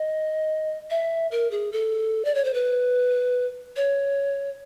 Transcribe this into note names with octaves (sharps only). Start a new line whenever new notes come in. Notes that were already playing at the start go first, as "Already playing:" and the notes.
Already playing: D#5
E5
A#4
G#4
A4
D5
C#5
C5
B4
C#5